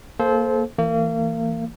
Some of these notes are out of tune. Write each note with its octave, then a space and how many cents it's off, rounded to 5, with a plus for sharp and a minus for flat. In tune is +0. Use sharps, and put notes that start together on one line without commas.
A#3 +0 A4 -30 C5 +0
E3 +0 A#3 -35